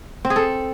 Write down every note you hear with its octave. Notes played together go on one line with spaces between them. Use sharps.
C4
G#4
A4